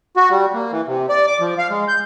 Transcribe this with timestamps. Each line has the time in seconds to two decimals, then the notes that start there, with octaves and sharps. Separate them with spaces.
0.17 F#4
0.31 G3
0.54 A#3
0.72 E3
0.87 C3
1.09 D5
1.27 D6
1.40 F3
1.58 F5
1.70 G#3
1.88 G6